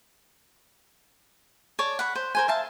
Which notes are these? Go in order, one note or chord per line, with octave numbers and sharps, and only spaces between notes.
C#5 D5 A5
F#5 B5
C5
A#4 C5 G#5
E5 F5 A5